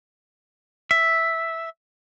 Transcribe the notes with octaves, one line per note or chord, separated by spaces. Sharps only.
E5